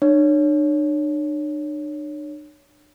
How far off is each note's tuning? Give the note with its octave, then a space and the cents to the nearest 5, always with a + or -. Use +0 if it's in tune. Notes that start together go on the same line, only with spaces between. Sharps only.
D4 +40 C#5 +10